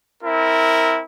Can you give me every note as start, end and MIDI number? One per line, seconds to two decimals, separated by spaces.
0.23 1.01 60
0.23 1.01 64
0.23 1.01 70